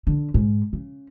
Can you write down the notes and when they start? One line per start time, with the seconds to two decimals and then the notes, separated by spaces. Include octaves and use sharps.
0.07 D3
0.34 G#2
0.73 C#3